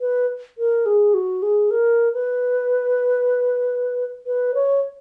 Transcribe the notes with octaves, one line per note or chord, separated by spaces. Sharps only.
B4
A#4
G#4
F#4
G#4
A#4
B4
B4
C#5